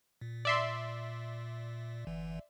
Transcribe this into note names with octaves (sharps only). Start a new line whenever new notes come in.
A#2
D5 E5 C6
G1 E3